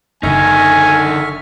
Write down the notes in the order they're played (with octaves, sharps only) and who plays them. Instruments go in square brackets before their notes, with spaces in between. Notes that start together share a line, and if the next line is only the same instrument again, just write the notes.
[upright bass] F#1 D4 [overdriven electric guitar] D3 D#4 [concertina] E5 C#6 F6 [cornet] G#5